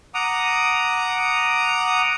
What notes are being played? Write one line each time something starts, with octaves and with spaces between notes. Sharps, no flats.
F#5 A#5 D6 D#6